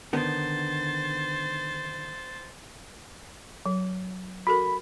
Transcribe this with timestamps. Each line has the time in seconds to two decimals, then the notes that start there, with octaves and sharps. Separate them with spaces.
0.13 D3 D#3 B3 C5 A6
3.66 F#3
4.47 F#4 A4 A#4 B5